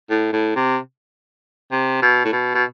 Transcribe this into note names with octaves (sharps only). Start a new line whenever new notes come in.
A2
A2
C3
C3
B2
A2
B2
B2